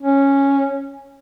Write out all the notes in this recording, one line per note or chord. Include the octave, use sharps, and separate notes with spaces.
C#4